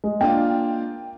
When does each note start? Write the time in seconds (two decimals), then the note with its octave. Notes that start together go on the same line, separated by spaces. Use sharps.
0.04 G#3
0.21 A#3 D4 F4 G5